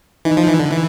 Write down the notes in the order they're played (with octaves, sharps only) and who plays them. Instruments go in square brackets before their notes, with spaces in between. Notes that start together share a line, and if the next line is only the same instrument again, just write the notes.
[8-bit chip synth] E3 [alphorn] D#4
[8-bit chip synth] F3
E3
D3
E3